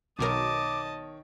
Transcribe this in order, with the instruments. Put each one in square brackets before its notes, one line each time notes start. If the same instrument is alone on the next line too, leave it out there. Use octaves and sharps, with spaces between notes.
[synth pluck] B1 B2 A#4 [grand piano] D#3 C#5 [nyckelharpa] D#5 A5 [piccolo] D6